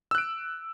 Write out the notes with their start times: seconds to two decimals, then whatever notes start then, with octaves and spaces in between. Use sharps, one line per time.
0.11 E6
0.15 F#6
0.18 D7